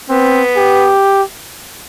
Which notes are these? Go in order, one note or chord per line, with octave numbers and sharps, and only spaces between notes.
B3 C4
G4